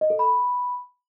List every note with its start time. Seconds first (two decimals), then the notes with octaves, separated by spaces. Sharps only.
0.01 D#5
0.10 A4
0.19 B5